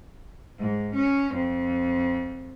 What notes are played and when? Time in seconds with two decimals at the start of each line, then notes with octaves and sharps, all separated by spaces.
0.58 G#2
0.94 C#4
1.34 F2